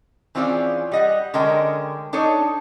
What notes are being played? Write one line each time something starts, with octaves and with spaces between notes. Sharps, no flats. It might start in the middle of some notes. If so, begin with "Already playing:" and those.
E3 C4 C#4 F4 G#4 D5
G3 D#5 F#5
D3 G#3 C#4 A#4 D#5 G5
D4 D#4 A4 C#5 D#5